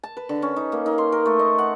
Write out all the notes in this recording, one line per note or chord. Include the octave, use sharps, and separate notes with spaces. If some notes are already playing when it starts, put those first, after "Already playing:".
A5
B4
D3
C#4
D#4
A#3
D#4
C6
A#4
A3
D#5
F#5